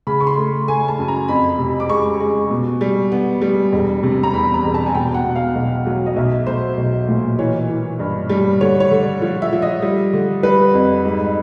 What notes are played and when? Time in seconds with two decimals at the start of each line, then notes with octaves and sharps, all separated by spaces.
0.07 C#3 B5
0.20 C#6
0.27 C6
0.37 A3
0.68 A3 G#5
0.88 A5
0.99 F#2
1.08 A#5
1.28 F2 B5
1.59 C3
1.80 D6
1.89 G#3 C#6
2.20 G#3
2.51 B2
2.81 G3
3.12 B3
3.42 G3
3.72 E1
4.03 C3
4.23 A#5
4.33 E2 B5
4.54 A#5
4.64 E1
4.74 A5
4.86 G#5
4.95 B2 G5
5.14 F#5
5.25 B2
5.36 F5
5.55 B1
5.87 F#3
6.06 D#5
6.16 B1 E5
6.47 B1 C5
6.77 B1
7.09 A#2
7.39 E3 C#5
7.69 E3
7.99 G2
8.30 G3
8.61 D3 C#5
8.80 C#5
8.91 D3
9.01 D5
9.22 F3
9.42 E5
9.53 F3
9.62 D#5
9.82 G3
10.13 D3
10.43 G3 B4
10.74 F2
11.05 G#2